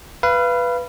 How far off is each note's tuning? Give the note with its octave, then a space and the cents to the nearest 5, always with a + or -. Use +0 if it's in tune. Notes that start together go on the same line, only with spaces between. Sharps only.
B4 +0 F5 -30